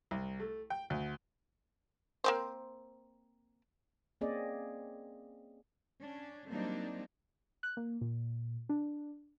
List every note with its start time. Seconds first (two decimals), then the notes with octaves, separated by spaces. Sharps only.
0.11 C2
0.40 A3
0.70 G5
0.90 D2
2.24 A#3 C4 C5
4.21 A#3 C4 C#4 G#4 D5 D#5
6.01 C#4 D4
6.49 F#3 G3 A#3 C4 D4 D#4
7.63 F#6
7.77 A#3
8.01 A#2
8.69 D4